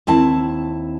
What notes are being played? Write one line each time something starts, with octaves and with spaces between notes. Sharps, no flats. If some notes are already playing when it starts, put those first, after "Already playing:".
D#2 C4 E4 A5